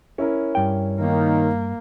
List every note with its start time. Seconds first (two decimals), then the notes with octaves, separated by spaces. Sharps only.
0.18 C#4 E4 A#4
0.55 G2 G5
1.00 D#3 A#3